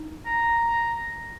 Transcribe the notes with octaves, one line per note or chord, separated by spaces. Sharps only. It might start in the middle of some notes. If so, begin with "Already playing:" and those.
Already playing: D#4
A#5